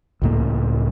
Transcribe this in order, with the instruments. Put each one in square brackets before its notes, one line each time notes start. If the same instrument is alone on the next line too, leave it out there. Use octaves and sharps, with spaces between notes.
[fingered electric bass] C#2 A2 A#3